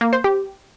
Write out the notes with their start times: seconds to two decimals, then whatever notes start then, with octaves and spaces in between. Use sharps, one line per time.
0.01 A#3
0.13 C5
0.24 G4